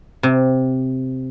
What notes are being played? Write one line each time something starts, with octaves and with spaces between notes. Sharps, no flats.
C3